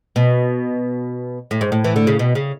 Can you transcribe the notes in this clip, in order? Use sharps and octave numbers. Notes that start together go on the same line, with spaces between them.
B2
A2
G#2
A2
E3
D3
C#3
B2
C#3